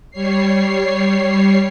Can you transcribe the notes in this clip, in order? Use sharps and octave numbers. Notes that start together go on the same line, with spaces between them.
G3 C#5 C7